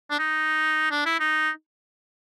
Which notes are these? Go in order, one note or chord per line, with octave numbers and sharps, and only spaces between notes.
D4
D#4
D4
E4
D#4